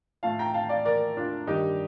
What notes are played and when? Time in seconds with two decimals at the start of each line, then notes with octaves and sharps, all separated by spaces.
0.23 A2 F3 F5 A5
0.39 G5 A#5
0.54 F5 A5
0.69 D5 F5
0.85 A#4 D5
1.17 D4 F4
1.47 G2 D#3 G3 D#4 G4